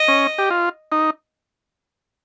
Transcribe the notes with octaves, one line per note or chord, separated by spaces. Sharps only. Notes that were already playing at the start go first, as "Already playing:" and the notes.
Already playing: D#5
C#4
G4
F4
D#4